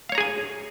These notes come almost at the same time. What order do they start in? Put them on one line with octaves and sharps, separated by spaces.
F5 C#5 A#5 G#4 G#5